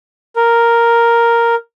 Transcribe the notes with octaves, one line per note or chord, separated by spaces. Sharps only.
A#4